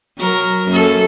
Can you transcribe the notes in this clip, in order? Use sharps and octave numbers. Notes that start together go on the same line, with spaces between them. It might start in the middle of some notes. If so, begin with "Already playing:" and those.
F#3 A#4
F#2 A#3 A4